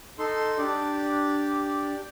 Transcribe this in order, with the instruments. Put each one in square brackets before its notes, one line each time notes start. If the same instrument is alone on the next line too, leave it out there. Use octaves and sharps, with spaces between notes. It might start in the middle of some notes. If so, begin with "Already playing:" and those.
[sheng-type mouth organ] D#4 A4 C6
[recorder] D4 [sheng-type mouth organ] G4 D5